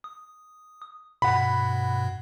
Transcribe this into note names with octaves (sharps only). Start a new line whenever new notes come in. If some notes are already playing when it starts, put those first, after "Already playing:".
D#6
G2 B2 F#5 B5